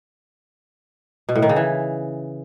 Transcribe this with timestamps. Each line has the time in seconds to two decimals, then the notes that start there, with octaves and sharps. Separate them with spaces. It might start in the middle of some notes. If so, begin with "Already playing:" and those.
1.29 B2
1.36 A2
1.42 D#3
1.49 C#3
1.56 E3